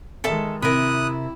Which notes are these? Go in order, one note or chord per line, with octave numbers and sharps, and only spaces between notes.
D#3 G#3 A4 E5 A5
C3 E4 A#4 B5 D#6 F#6